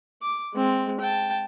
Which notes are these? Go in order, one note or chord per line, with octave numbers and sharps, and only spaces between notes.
D6
G#3 C4
G5 A5